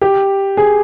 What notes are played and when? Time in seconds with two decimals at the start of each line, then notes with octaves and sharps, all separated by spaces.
0.01 G4
0.57 G#4